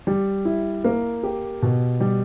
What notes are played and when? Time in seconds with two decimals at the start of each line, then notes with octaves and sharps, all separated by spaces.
0.07 G3
0.45 E4
0.84 A#3
1.23 G4
1.62 B2
2.00 G3